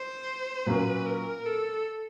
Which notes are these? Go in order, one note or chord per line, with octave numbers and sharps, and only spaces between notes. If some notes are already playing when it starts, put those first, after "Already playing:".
Already playing: C5
A#2 F#3 A#3 C#4 B4
A#4
A4